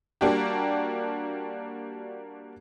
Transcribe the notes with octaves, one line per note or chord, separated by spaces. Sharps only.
G3 A#3 D4 F#4 G4